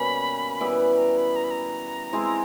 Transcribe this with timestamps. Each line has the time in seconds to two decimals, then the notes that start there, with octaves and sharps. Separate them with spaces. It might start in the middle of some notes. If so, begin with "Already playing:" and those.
Already playing: B2 G3 A#3 C#4 B5
0.60 E3 G3 B3 E4
0.80 B5
0.98 A#5
1.17 B5
1.36 A#5
1.44 B5
1.51 A#5
2.13 G#3 C4 E4 G#4